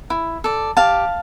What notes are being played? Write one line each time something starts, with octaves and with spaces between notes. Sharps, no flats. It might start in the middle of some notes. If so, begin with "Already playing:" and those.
E4
A4 D5
G4 F5 A5